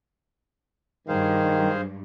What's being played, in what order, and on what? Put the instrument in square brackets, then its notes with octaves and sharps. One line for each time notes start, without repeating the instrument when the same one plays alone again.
[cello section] G2 [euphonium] D#3 [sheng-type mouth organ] G#4 C5 F5